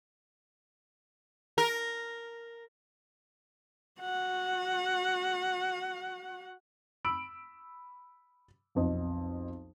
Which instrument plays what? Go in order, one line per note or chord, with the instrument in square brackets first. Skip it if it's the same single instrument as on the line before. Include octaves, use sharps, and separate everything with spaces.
[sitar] A#4
[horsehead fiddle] F#4 F#5
[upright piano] B5 E6 D7 F#7
B1 F2 D#5